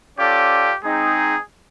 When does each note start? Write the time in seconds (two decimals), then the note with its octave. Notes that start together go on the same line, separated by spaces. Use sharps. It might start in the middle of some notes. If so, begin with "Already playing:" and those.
0.19 C#4 F4 G4 A4 D5
0.84 G#3 C4 D#4 G#4